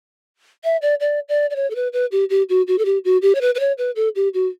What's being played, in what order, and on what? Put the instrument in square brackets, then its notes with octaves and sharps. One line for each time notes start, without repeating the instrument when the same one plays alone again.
[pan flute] E5
D5
D5
D5
D5
C#5
A4
B4
B4
G4
G4
F#4
F#4
A4
G4
F#4
G4
C#5
B4
B4
C#5
B4
A4
G4
F#4